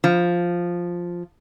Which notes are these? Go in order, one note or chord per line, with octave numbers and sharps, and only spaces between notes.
F3